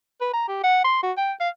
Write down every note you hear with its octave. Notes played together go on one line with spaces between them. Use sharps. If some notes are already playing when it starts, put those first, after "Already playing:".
B4
A#5
G4
F#5
C6
F#4
G5
F5